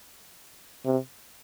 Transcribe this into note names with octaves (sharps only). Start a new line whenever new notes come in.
C3